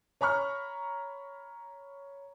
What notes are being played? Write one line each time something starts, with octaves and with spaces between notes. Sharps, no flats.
C#5 A#5 B5 C#6 F6